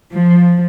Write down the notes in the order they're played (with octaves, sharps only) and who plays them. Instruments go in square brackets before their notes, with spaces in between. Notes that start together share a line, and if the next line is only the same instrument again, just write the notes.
[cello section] F3